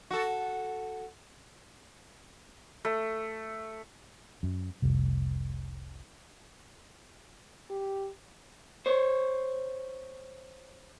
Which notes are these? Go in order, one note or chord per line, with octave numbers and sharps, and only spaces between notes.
F#4 A4
A3
F#2
F1 C2
G4
C5 C#5